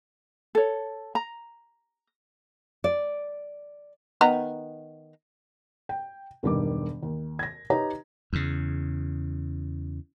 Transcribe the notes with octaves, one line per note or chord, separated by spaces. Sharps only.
A4 C#5
A#5
D5
D#3 B3 A#5
G5
E1 G2 D3 D#3 G3 D6
D#2
G#6 A#6
D#4 G4 B4 C#5 D#5 A#5
E2 C#3